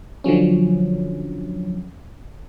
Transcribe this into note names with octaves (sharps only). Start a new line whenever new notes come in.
D3 F3 F#3 C#4